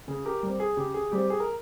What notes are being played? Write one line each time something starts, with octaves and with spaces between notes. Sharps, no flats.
C#3 G#4
G4 A#4
G3 C4
G#4
C#3 G4
G#4
G3 C4 G4
G#4
A#4